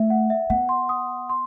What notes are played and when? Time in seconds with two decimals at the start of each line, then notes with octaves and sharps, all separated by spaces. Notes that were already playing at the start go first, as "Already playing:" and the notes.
Already playing: A3 E5
0.10 F#5
0.30 E5
0.50 B3 F#5
0.69 C6
0.89 D#6
1.29 C6